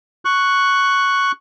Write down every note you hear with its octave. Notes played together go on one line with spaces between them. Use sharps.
C#6 F#6